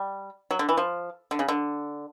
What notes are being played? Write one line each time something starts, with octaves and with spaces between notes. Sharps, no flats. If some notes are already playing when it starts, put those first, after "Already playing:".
Already playing: G3
F#3
D3
E3
F3
D3
C#3
D3